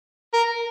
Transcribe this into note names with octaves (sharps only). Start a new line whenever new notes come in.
A#4